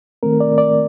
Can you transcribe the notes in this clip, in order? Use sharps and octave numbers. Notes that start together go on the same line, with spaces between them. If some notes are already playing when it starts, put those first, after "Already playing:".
D#3 A3 C4 A#4
D5
D5